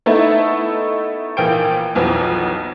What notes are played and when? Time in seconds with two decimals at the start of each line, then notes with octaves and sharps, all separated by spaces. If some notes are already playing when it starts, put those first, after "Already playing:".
0.06 A3 B3 D#4 E4 A4 E5
1.37 A#1 E3 A#3 G5 G6 D7
1.95 B1 F2 E3 B3